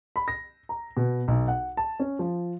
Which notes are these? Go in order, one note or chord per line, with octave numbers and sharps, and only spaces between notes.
B5
A#6
A#5
B2
B1
F#5
A5
C#4
F3